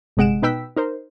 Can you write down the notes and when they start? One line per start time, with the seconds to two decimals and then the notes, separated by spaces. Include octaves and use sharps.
0.17 G1 C3 G#3 F#5 D7 E7
0.42 B2 D#4 B4 G5 E6 B6
0.77 D#4 A#4 C5